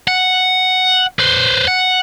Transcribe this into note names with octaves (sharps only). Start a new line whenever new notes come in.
F#5
B4 C5
F#5